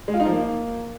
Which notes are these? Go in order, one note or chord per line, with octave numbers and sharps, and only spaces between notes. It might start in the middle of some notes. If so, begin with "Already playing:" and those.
G#3
F4
D#4
F3
A#3